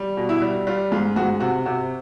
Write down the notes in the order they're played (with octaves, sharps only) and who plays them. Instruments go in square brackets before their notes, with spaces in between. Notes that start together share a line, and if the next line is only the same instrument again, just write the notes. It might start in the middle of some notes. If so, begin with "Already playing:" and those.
Already playing: [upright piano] G3
B2
E4
G3
G3 F4
G#2 F4
G#2 F#4
C3 F#4
C3 F#4